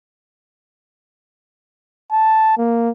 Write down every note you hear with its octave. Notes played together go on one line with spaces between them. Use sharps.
A5
A#3